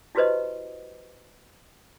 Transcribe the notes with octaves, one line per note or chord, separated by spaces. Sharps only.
E4 F#4 G4 B4 C5 D#5